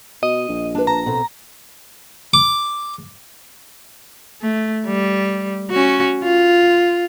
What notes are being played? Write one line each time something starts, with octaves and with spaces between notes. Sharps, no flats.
B2 D#5
A#1
D4 B4
A5 A#5
B2 C4 A4
D6
A3
G3
C#4 F#4
F4